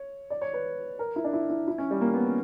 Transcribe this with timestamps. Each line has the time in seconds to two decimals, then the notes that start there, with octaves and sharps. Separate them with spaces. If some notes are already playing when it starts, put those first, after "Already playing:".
Already playing: C#5
0.30 D5
0.41 C#5
0.54 B4
0.99 A#4
1.16 E4
1.24 D4
1.33 E4
1.50 E4
1.68 E4
1.78 C#4
1.91 G3
2.01 A#3
2.14 B3
2.25 C#4